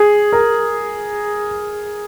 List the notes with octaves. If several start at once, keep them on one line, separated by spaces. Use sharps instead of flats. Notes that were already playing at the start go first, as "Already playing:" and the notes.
Already playing: G#4
A#4